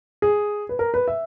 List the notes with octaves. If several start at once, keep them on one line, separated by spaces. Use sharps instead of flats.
G#4
B4
A#4
B4
E5